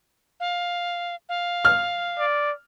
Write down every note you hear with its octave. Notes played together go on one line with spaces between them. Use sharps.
F5
F5
F6
D5